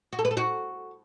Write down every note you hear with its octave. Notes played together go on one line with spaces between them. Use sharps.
F#4
A4
B4
A4
F#4